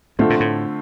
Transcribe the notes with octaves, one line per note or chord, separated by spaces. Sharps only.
A2 D3 A3 C4 F4
A#2
A2